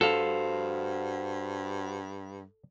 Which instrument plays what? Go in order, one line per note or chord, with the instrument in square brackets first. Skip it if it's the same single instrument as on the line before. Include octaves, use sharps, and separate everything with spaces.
[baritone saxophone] G2 [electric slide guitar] F#4 C5 F5 [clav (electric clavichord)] A4